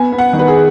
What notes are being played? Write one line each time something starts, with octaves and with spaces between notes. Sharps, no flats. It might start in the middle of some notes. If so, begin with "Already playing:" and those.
Already playing: B3 G#5
B3
F#5
D#3
B4
G#4